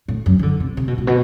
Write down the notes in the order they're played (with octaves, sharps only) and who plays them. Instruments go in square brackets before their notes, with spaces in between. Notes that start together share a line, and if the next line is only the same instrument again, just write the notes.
[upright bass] A2
F#2
E3
D3
C3
C3
B2
A2
B2